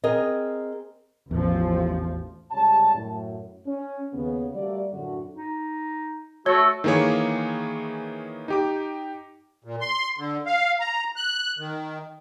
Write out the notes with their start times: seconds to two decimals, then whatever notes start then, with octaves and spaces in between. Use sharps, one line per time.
0.04 C4 G#4 A#4 D#5
1.31 A1 E2 F3
2.51 C#2 C3 G3 C#5 A5
2.94 F#2 A2
3.67 C#4
4.14 D#2 C#3 B3
4.54 G3 A3 A#3 F#4 D5
4.92 F#2 A2 D3 F#4
5.33 D#4
6.46 A3 F#4 C#5
6.84 D#3 E3 A#3 G#4 C#5
8.48 D#4 G4 D6
9.64 A#2
9.81 C6
10.18 D3
10.46 F5
10.80 A#5
11.16 F#6
11.58 D#3